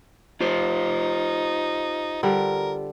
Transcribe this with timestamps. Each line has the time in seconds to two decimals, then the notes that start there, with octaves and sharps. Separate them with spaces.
0.41 D#4 F4 G4 C5
2.23 D3 G3 A#4